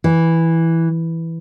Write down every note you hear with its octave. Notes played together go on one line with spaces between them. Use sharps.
E3